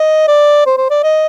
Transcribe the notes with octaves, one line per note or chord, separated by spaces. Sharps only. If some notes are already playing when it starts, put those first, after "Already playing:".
Already playing: D#5
D5
C5
C5
D5
D#5